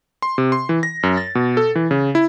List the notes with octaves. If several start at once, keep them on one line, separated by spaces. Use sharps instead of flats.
C6
C3
C6
E3
A#6
F#2
A6
B2
A4
E3
C#3
E4